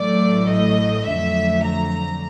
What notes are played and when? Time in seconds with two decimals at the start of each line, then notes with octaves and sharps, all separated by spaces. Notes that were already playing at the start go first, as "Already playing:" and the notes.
Already playing: A1 A2 F#3 A3 D5
0.49 D#5
1.07 F2 D3 F#3 A3 E5
1.65 A#5